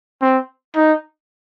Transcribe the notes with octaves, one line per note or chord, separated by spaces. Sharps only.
C4
D#4